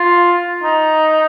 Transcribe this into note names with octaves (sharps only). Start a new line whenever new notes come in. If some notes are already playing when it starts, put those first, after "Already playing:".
Already playing: F4
D#4